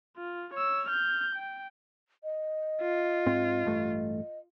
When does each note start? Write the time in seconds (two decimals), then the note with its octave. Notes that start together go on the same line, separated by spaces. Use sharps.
0.17 F4
0.54 C#5 E6
0.89 F6 G6
1.35 G5
2.24 D#5
2.82 F4
3.26 G#2 C4
3.65 A1 G2 A3